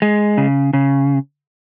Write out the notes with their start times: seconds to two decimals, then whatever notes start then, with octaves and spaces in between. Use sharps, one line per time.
0.02 G#3
0.38 C#3
0.73 C#3